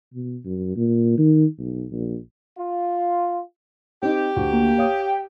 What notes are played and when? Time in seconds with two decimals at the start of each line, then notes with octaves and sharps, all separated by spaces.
0.14 B2
0.45 F#2
0.76 A#2
1.18 D#3
1.58 B1
1.92 A#1
2.57 F4
4.03 C4 D#4 G4
4.36 D2
4.53 A#3
4.78 C#5 F5 D#6
5.00 G5